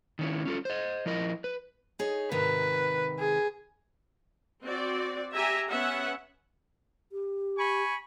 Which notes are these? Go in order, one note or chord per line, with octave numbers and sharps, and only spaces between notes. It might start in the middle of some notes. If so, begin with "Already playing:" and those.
D#3 C#4 E4
C#4 F4 A4
C5 D#5
F3 E4 A#4 D#5
B4
D#4 G#4 C#5
G#2 C3 D#3 B4
G#4
C4 F#4 D5
G4 E5 G#5 A#5
B3 C#4 E5 F#5
G4
G#5 B5 C#6